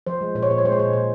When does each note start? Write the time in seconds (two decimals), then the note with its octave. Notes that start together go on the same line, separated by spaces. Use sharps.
0.07 F3 C5
0.21 G#3
0.35 A#2 C5
0.43 C#5
0.50 A#2 C5
0.58 C#5
0.64 G#3 C5
0.72 C#5
0.79 A#2 C5
0.93 A#2 C5